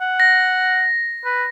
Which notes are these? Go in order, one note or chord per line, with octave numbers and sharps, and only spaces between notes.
F#5
A#6
B4